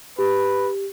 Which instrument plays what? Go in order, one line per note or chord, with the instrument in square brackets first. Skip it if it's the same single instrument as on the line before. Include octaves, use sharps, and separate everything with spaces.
[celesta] G4 [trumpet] B4